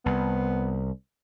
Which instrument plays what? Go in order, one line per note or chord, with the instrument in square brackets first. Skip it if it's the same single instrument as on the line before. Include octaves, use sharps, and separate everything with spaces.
[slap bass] C2 [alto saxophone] B3